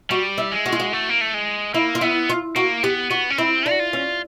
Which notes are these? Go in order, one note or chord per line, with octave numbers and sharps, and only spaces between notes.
G3 F#4
E4
G#3
F#4
F4
F#4
A3
A#3
A3
G#3
A#3 E4
F4
B3 E4
F4
A#3 F#4
B3 G4
B3 F#4
C#4
C4 E4
D4
F#4
F4
C#4